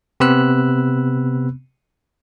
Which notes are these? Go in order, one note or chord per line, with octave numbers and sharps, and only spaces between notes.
C3 B3 C4 B5 E6 F#6